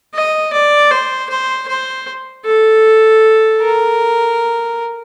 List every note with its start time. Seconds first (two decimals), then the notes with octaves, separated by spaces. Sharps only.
0.15 D#5
0.53 D5
0.91 C5
1.29 C5
1.68 C5
2.46 A4
3.61 A#4